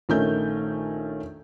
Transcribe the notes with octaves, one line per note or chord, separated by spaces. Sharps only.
A#1 D#3 A3 C#4 A#4 G6